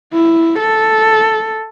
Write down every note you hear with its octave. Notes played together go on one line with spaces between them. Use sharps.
E4
A4